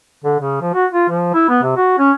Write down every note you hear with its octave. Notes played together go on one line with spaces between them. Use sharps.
D3
C#3
F3
F#4
F4
F3
E4
B3
C3
F#4
C#4